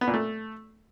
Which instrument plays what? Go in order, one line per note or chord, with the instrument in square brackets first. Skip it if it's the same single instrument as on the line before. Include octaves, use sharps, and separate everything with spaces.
[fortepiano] B3
A#2
A3